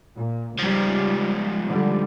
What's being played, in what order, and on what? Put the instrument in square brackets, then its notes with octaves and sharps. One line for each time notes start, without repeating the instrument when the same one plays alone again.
[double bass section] A#2
[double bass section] C#2 G3 [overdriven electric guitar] G#2 F3
[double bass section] D3 G3